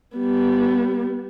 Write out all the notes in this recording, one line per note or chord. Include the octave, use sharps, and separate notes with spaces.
G3 B3